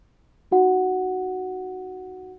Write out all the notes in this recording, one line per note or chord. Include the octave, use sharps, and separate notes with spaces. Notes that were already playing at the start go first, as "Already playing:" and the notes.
D#4 F#4 F#5